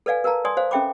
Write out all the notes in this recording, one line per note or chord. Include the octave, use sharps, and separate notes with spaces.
A4 B4 D5 F5 G#5
A#4 B4 F5 A5 A#5
D5 G#5 C6 D#6
C5 F5
C#4 A4 E5 G5 B5 D6